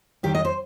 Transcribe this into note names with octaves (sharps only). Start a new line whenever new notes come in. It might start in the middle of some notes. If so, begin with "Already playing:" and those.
D#2 D#3 G3 G4
D#5
C5